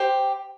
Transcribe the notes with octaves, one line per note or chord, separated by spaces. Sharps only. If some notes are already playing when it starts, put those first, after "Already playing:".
Already playing: G4 C5